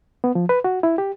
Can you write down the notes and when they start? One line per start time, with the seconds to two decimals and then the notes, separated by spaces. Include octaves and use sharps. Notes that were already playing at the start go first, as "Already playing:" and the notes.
0.24 B3
0.35 F3
0.49 B4
0.64 F#4
0.83 E4
0.98 G4